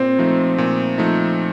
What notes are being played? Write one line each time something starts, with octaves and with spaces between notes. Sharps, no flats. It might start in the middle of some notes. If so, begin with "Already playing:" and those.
Already playing: A#2 C4
F3 A3 D#4
A#2
F3 A3 D#4